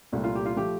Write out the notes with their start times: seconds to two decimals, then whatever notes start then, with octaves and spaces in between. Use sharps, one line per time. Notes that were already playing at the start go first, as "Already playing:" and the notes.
0.12 C2 A#2 A3
0.24 F4
0.36 G4
0.46 F4
0.57 F3 A3 G4